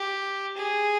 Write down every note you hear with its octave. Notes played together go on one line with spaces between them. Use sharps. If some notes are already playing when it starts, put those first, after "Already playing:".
Already playing: G4
G#4